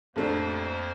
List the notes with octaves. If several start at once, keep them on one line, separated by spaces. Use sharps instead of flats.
A1 F2 A3 A#3 D4 C5